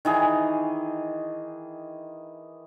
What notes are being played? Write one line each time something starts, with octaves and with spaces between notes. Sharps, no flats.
D#3 E3 G#4